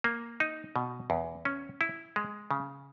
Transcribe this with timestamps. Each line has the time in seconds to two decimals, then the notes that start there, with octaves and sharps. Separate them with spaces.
0.04 A#3
0.40 D#4
0.76 B2
1.10 E2
1.45 C#4
1.81 E4
2.16 G#3
2.51 C#3